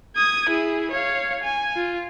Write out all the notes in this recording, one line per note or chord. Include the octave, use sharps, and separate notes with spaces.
D#6 G#6
E4 G#4
C#5 F5
G#5
F4